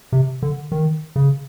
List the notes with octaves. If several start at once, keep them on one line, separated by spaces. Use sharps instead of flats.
C3
D3
D#3
C#3